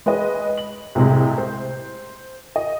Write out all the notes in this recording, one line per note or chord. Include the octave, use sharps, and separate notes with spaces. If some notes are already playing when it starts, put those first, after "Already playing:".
G#3 B4 C#5 D#5
F#7
C2 A2 C3 G#3
C5
D#5